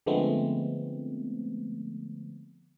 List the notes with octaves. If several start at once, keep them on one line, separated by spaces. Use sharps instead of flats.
D3 F3 G#3 A3 B3 C4